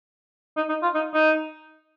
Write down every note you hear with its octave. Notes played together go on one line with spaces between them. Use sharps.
D#4
D#4
F4
D#4
D#4